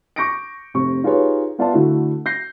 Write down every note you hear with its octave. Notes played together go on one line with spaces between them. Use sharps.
C#6 D6 G6 A#6 C#7 D7
F1 C3 C#6
D#4 F4 G4 G#4 B4 C#5
B3 F4 D5 E5 F5 A5
D3 A3 E4 F#4
G6 A#6 C7